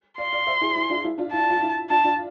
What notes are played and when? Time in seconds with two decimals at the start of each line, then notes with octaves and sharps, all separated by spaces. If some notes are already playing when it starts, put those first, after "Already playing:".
0.18 D5 F5 C6
0.33 D5 F5
0.47 C5 E5
0.61 E4 G#4
0.76 E4
0.89 D4 F4
1.04 E4
1.18 D4 F4
1.32 E4 A5
1.50 F4
1.62 E4
1.90 D4 F4 A5
2.04 D4 F4